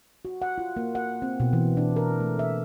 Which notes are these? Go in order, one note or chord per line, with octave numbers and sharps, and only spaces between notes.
F#4
F#5
F4
A#3
F#5
C4
B2
E3
D4
A#4
A3
E5